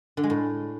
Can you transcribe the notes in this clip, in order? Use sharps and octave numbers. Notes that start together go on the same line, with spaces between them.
D3
G#3
A2